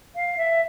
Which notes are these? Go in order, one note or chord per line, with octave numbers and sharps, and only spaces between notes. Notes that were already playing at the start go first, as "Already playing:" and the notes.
F5
E5